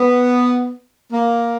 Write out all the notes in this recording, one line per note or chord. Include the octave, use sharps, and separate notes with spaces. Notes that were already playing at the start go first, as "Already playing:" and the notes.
Already playing: B3
A#3